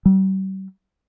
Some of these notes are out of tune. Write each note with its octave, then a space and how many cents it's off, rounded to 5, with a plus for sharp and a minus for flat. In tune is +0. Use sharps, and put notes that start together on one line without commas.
G3 -40